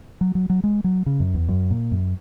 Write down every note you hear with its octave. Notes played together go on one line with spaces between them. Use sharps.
F#3
F#3
F#3
G#3
F#3
C#3
F#2
E2
F#2
A#2
F#2